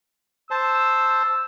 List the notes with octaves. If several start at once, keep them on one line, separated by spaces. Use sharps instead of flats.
C5 A5 E6